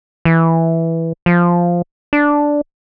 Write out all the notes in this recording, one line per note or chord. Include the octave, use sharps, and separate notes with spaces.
E3
F3
D4